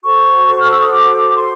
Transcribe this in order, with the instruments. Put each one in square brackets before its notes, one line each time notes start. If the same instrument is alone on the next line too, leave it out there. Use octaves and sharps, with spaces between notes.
[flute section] F#4 A4 C5 C#6
F6
E6
D#6
D6
C6